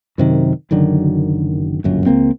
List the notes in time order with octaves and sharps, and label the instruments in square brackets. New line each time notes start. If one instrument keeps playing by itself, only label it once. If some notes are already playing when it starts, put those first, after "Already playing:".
[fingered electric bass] F#2 C3 D#3
F#1 F#2 D3 D#3
G1 C#2 F#2 A#2
C#2 A#3 C4